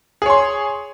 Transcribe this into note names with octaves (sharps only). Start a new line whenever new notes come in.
G#4 C#5 C6